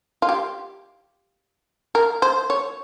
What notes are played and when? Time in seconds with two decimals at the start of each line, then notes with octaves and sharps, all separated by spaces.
0.22 F4
0.29 G4
1.95 A#4
2.22 C5
2.50 C#5